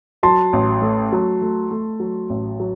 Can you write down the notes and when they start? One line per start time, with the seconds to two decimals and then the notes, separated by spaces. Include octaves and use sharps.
0.23 F#3 A5 C6
0.53 A1
0.82 A3
1.12 F#3
1.42 A3
1.71 A3
2.00 F#3
2.30 A1
2.60 F#3